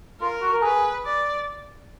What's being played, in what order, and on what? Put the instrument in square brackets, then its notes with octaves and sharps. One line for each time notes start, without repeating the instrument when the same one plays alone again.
[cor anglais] F4 [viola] A#4
[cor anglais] F#4
A#4
[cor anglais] G#4 [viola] B4
[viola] D5